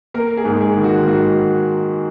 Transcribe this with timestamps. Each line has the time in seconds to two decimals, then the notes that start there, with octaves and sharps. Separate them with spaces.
0.14 A#3 A#4
0.37 G#4
0.45 G#2
0.61 G#4
0.77 D#3
0.84 F#4
1.07 G#2 F#4